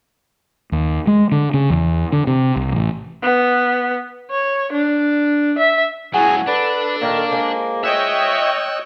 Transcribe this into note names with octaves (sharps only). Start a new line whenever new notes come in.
D#2
G#3
D3
C#3
E2
D3
C3
C2
A1
B3
C#5
D4
E5
C#2 F#3 E4 G#4 F#5 G#5 A5
D4 A4 B4 D5
A#2 D#3 A#3 A#4
G#3 F4 C5
C#5 D#5 E5 G5 E6 F#6